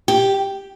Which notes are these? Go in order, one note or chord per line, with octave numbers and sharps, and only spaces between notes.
G4